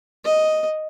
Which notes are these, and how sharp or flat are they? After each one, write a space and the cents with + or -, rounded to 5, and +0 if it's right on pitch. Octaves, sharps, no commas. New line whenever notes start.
D#5 +0